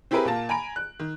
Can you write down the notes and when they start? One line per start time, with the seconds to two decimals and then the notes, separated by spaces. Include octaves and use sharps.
0.11 C4 E4 G4 G#4 A#4 B4
0.25 A#2 A#3 A5
0.49 G#5 A#5 B5 D7
0.76 F#6
0.99 D#3